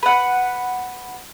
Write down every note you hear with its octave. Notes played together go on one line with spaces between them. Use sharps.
B4 F#5